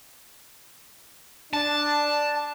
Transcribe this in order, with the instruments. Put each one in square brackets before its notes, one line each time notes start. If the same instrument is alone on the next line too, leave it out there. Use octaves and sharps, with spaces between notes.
[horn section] D4 [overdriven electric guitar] A5